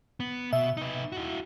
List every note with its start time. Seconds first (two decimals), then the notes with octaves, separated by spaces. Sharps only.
0.20 B3
0.53 B2 E5
0.77 D#4 B4
1.12 E4 F#4